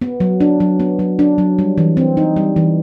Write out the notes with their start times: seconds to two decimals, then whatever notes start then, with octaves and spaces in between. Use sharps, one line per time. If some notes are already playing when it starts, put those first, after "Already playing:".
0.02 B3
0.20 F#3
0.40 D4
0.60 F#3
0.80 B3
0.99 F#3
1.19 D4
1.38 F#3
1.59 G3
1.78 E3
1.97 C4
2.17 D#4
2.36 G3
2.56 E3